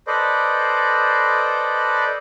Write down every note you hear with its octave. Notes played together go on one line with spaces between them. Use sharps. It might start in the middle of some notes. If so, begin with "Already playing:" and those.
A4 B4 C5 D5 D#5